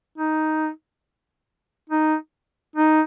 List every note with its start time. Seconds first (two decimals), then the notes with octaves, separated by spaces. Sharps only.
0.18 D#4
1.89 D#4
2.76 D#4